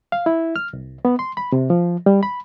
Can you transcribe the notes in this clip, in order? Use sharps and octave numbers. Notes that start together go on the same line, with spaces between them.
F5
E4
F6
C2
B3
C6
B5
C3
F3
G3
B5